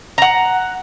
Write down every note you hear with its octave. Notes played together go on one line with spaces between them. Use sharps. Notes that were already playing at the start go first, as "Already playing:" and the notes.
F#5 A#5